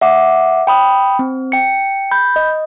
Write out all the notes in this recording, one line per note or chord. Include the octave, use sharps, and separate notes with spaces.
E5 F#5 D6
G5 B5 D#6
C4
G5 C#7
B5 G6
D#5